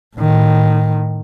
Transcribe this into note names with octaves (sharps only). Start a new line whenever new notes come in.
A2 D#3